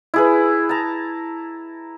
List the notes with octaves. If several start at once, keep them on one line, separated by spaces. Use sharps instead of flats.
E4 G#4 B4
A5 A#5